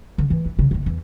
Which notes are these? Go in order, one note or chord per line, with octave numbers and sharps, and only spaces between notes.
D3
E3 A3
E3
C#3
F#1 D#3
E2